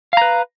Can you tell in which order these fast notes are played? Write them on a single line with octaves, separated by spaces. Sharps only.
F5 A#5 B4